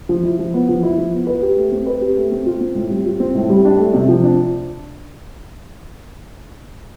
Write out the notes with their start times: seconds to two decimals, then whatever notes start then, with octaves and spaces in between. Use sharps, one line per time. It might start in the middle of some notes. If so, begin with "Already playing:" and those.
0.09 F3
0.23 E4
0.39 F3
0.54 B3
0.69 F3
0.83 E4
0.98 F3
1.13 B3
1.27 B4
1.42 G4
1.57 A3
1.72 C4
1.86 B4
2.01 G4
2.17 A3
2.32 C4
2.46 F4
2.61 C4
2.75 A2
2.90 G3
3.06 F4
3.20 C4
3.35 A2
3.50 G3
3.65 D4
3.79 A3
3.94 C3
4.09 F3
4.24 D4